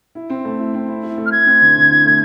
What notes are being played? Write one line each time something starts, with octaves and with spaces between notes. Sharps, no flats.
E4
C4
A3
E4
C4
E4
E4
A3
F6
A3 G#6
C4
D3
D3
E4
A3